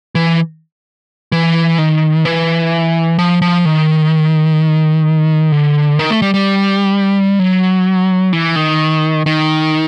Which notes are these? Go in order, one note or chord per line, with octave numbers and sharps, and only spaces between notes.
E3
E3
D#3
E3
F3
F3
D#3
D3
D#3
A3
G3
G3
F#3
E3
D#3
D#3